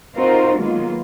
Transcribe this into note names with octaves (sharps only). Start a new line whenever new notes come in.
C4 D#4 F4 F#4 A#4 C5
D#3 F#3 G#3 A#3 B3 F4